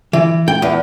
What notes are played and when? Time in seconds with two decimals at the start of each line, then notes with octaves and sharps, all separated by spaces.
0.13 E3
0.48 G5
0.62 E2